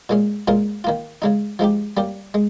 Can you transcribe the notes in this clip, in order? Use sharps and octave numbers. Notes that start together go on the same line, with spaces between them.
A#2 G#3 C#4
A#2 G#3 C#4 F4 A#4
D#3 A#3 F4
C#3 G#3 D#4
F3 G#3 D#4 G4
G3 A#3 C#4 G4
G#3